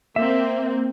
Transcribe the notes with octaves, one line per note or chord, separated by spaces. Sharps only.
A#3 C4 E5